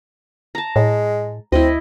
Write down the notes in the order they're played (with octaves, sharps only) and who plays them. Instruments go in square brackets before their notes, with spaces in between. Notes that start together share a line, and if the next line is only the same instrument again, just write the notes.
[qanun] A5 A#5
[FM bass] A2 [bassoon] G#3
[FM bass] D2 [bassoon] C4 [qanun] E4 D#5